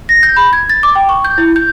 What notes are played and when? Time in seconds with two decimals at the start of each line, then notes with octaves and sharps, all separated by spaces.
0.09 A#6
0.23 G6
0.36 B5
0.53 G#6
0.70 A6
0.83 D6
0.95 G5
1.09 C#6
1.24 G6
1.38 E4
1.56 G6